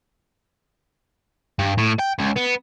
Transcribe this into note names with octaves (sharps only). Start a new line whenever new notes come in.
G2
A2
G5
C#2
B3